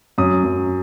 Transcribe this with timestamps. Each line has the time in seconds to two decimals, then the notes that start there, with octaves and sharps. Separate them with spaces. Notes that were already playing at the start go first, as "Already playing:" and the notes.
0.18 F#2 D#6
0.43 F#2